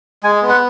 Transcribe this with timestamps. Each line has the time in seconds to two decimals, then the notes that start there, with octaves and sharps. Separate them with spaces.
0.23 G#3 G#5
0.42 B3
0.49 F#5